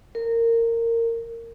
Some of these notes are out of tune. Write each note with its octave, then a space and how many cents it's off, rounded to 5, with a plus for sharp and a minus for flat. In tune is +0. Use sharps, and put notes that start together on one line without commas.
A#4 -20